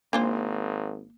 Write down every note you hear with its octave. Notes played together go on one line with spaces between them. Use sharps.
G#1 A#3 D4 F4 C5